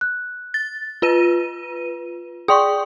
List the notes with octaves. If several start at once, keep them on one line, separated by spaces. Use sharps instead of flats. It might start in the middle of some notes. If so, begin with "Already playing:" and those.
F#6
A6
F4 B4 D#7
G#4 D5 G5 C6 C#6 D#6